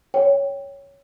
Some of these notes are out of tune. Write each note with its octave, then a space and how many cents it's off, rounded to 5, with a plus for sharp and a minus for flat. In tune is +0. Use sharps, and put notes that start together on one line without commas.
C#5 +5 G5 +0